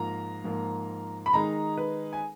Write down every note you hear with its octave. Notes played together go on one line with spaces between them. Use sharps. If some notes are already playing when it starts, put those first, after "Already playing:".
Already playing: G#2 F3 A#3 F4 A#5
G#2 F3 A#3 F4
B5
D#3 G#3 D#4 G#4 A#5
B4
G#5